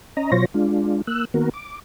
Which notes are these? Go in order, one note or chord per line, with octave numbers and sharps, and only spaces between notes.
C#4 D#5 A#5
B2 F#3 F4 C5 C#5 A#6
G#3 D4 F4
A#3 E6 F#6
D#3 A#3 B3 F#4 A#4
D6